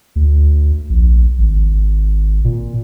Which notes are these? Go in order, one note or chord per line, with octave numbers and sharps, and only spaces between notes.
D2
A#1
G#1
A#2